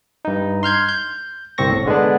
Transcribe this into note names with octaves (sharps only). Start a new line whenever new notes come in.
G2 D#4
C6 F6 G6 G#6
G6
G1 C2 C4 C#6 A#6
A2
D3 G#3 B3 D4